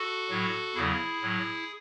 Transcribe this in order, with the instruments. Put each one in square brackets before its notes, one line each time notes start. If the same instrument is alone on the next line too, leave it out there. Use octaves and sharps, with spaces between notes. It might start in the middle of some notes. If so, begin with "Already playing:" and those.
Already playing: [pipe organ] F#4 A4
A2 F#3
E2 C#3 F#3 E4 G#4
A2 F#3